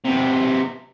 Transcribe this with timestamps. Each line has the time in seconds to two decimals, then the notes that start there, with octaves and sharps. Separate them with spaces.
0.05 C3 B3